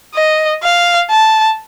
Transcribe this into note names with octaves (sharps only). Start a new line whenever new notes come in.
D#5
F5
A5